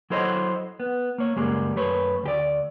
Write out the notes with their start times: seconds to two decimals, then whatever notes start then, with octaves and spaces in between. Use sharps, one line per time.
0.10 F#3 E4 A4 C5 C#5 D#5
0.80 B3
1.18 A#3 C#5
1.37 C#2 F#2 G3 G#3 A#3
1.76 F#2 A3 B4 C#5
2.23 D2 G4 D5